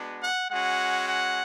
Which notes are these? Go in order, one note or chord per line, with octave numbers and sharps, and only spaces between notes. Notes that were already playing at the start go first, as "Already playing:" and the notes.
Already playing: G#3 B3 D4 F#4
F#5
G#3 C#4 F#4 F#5
F#5